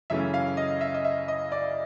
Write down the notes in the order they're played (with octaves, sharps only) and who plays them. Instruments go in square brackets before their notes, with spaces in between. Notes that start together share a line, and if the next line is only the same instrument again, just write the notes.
[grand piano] F#2 C#3 E3 A3 C#4 E5
F5
D#5
E5
D#5
E5
D#5
D5